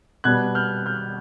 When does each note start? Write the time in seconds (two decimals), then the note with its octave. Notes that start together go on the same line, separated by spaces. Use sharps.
0.24 B2 G3 B3 F#6 G#6
0.55 F6 G6
0.86 F6 G6